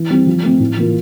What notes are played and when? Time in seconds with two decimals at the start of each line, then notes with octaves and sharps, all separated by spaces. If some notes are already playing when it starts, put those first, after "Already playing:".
Already playing: E3
0.10 G3 C4
0.27 F3
0.43 A3 C4
0.60 A2
0.77 E3 A#3 F4